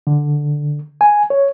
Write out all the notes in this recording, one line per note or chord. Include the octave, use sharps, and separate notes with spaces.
D3
G#5
C#5